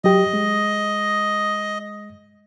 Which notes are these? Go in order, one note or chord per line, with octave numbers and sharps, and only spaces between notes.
F#3 G4 D#5
G#3